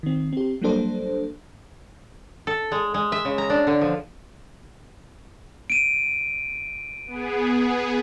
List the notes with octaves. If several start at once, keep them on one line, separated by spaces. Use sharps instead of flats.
D#3 C4
C4 G4
F#3 G3 A#3 D4 A4 C5
A4
G#3
G#3
E5
C#3
A#5
D4
D3
F3
D7 D#7
B3 G#4